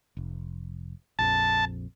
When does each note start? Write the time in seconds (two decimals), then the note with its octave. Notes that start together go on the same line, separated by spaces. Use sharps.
0.17 F1
1.19 A#1 F2 A5